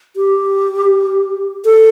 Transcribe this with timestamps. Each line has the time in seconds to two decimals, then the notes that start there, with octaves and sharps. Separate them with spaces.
0.16 G4
1.65 A4